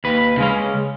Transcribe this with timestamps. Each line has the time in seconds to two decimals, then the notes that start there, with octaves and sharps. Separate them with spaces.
0.04 D#2 B4
0.38 C#3 G#3 C#4